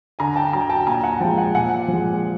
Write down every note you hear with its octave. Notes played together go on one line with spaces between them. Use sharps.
D3 G#5 A#5
G5 A5
F#3 G#5 A#5
G5 A5
A#2 G#5 A#5
F#5 G#5
F3 G#3 G5 A5
F#5 G#5
A#2 F#5 G#5
F3 G#3